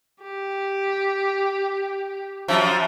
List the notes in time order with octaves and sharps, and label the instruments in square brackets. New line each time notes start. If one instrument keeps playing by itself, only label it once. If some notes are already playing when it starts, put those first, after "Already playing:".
[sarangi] G4
[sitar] F#2 F3